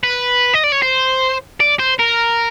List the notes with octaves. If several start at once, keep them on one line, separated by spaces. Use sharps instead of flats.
B4
D#5
D5
C#5
C5
D5
C5
A#4